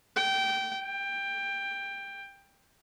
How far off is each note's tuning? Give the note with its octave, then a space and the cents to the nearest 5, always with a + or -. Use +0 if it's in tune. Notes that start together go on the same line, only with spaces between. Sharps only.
G5 -20
G5 +15